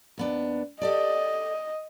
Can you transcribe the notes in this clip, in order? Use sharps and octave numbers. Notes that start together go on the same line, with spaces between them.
D#2 B3 D4
G4 A4 D5 D#5